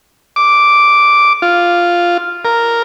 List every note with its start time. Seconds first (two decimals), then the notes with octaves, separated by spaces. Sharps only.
0.36 D6
1.42 F4
2.45 A#4